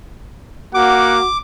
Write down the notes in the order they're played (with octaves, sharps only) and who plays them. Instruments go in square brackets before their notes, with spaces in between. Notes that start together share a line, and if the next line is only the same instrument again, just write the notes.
[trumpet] A#3 [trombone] F#4 [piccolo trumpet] F#5 [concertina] D6